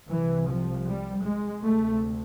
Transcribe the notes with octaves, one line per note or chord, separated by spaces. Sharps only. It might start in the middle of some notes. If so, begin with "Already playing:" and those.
C2 C3 E3
F3
G3
G#3
D2 C3 A3